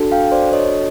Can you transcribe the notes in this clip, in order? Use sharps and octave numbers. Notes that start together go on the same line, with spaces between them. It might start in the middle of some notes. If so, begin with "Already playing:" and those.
Already playing: D4 F#4 A4
F5 G5
C5 D5
C#5 D#5